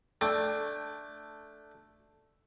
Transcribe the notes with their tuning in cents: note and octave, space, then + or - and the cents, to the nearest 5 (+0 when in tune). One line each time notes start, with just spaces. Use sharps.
A3 +0 D4 +0 G5 +25